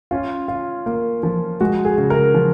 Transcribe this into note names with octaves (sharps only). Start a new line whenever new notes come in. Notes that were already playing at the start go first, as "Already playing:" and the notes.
C#4 F4
F4
A#3
F3
G#3 F#4
G#4
C#3
A#4
F3